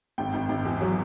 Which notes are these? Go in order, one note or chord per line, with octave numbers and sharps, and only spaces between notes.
G#1 G5
G#1
G#1
E2
F#3